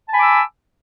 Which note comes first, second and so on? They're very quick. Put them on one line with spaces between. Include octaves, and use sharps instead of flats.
A5 G#5 B5 D6 E6